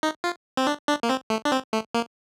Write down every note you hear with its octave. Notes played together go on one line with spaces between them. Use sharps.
D#4
F4
C4
D4
D4
A#3
C4
A3
D4
C4
A3
A#3